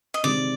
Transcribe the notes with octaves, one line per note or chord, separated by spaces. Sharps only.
D#5
C3 D#3 G#3 C4 D5